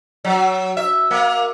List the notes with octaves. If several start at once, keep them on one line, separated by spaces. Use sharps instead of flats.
F#3
E5
A#3